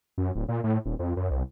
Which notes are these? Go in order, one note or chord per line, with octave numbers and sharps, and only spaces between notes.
F#2
D1
A#2
A2
D#1
F2
F#2
C2